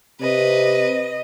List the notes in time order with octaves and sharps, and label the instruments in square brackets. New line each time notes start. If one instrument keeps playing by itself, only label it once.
[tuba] C3 [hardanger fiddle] B4 [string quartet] D#5